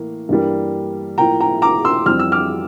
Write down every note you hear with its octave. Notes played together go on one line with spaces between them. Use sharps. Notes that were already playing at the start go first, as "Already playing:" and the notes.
Already playing: A2 E3 A#3
G2 E3 G3 A#3
A2 F3 A#3 G5 A#5
G5 A#5
A#5 D6
C6 E6
F2 E3 G3 C4 F6
E6
D6 F6